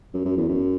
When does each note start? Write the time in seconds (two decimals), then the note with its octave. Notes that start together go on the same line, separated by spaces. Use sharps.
0.14 F#2
0.25 F#2
0.37 E2
0.48 F#2